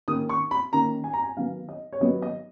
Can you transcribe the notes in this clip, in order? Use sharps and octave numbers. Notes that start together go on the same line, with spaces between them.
D#3 A#3 C#4 D#6
C#6
B5
D#3 A#3 C#4 A#5
G#5
A#5
G#5
D#3 F#3 B3 F5
D#5
C#5
D#3 F#3 B3 D#5
D#5